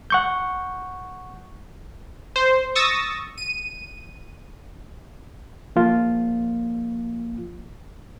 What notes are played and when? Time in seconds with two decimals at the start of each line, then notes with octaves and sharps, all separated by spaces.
0.10 F#5 C#6 G6
2.36 C5
2.75 C#6 D#6 E6 A6 A#6
3.38 D#7
5.76 F3 A#3 F4